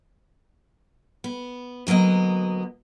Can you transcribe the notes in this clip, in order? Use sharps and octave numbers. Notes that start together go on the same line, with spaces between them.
B3
D2 F#3 A#3 B3 D#5